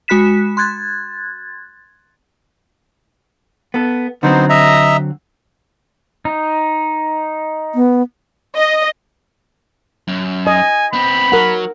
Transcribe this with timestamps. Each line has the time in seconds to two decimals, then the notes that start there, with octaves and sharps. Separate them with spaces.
0.08 G#3 F#4 B5 F#6 B6 E7
0.57 C6 F#6 G#6 A6
3.74 B3 A4
4.23 D3 F#3 B3 C4 D#4 C5
4.50 D#5 E5 A#5
6.25 D#4
7.75 B3
8.56 D#5
10.08 F#2
10.47 D#5 G#5
10.93 B3 C4 B5
11.32 F#3 A#4 F#5